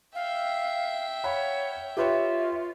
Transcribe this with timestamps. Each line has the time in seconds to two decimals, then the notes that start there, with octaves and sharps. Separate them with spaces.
0.15 E5 F5 G5
1.24 C#5 F5 F#5 B5
1.97 F4 G4 B4 C#5 E5